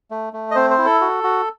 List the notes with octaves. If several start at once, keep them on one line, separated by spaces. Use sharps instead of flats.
A3
A3
D#5
C4 C5
C5
E4
A4
F#4
F#4